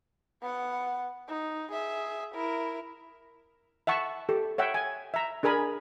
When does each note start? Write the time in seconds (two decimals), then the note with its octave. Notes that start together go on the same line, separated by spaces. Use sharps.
0.42 B3 F#5
1.28 D#4
1.72 G#4 E5
2.34 E4 A#4
3.87 E5 F#5 A5 C#6
4.29 G4 A4
4.58 C#5 E5 F#5 G5
4.74 G#5
5.14 E5 A#5
5.43 D4 G#4 A#4 G#5 B5